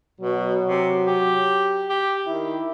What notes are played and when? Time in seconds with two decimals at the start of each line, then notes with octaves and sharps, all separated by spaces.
0.20 B2 F#3
0.66 C3
1.07 G4
1.89 G4
2.27 D#3 E4